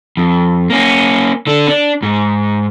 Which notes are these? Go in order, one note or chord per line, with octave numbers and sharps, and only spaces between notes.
F2
A#3 C#4
D3 D4
D4
G#2